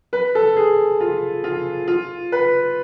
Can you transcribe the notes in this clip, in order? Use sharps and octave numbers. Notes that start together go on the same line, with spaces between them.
B4
A4
G#4
F4
F4
F4
B4